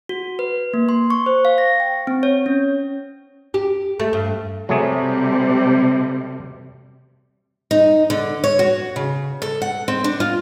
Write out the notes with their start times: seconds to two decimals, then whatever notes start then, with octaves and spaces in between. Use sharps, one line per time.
0.09 F#4
0.39 B4
0.74 A#3
0.89 C6
1.10 C#6
1.26 C5
1.45 F5
1.58 A#6
1.80 G5
2.07 C4
2.23 C#5
2.46 C#4
3.54 G4
4.00 A3
4.13 G2
4.69 C3 F#3 G3 A3 G#4
7.71 D#4
8.10 D3
8.44 C#5
8.59 F#4
8.96 C#3
9.42 A4
9.62 F#5
9.88 C4
10.04 D4
10.20 F4